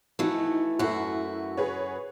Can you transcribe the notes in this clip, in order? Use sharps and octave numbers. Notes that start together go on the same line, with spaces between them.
E3 F3 A3 D#4 F#4
F#2 A3 E4 F#4
G#4 B4 C#5